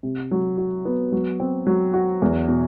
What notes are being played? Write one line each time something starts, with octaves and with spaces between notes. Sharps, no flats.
C3
F#3
F#4
B3
F#3
C4
F#3
F#4
E2
B2